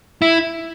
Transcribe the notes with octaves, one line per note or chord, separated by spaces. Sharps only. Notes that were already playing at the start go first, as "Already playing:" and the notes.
E4